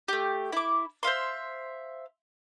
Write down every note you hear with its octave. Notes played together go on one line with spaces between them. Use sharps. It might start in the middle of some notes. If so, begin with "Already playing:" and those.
A3 G4
E4 D6
C5 E5 F5 C6